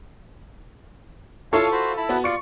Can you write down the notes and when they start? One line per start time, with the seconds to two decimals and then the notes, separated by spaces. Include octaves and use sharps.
1.53 E4 F4 A4 C#5 F5 A5 C#6
1.72 F#4 C5 B5
1.97 E4 A5 B5
2.09 B3 F#4
2.24 F4 D5 C#6 C#7